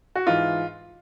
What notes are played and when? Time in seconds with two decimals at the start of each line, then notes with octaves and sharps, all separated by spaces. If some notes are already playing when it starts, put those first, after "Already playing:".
0.15 F#4
0.27 G#2 E3 F4